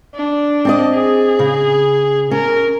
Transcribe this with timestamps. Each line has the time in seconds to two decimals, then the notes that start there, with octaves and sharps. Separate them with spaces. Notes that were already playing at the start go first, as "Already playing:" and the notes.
0.15 D4
0.65 C4 D5 D#5
0.95 G#4
1.39 C#3
2.31 C#4 A#4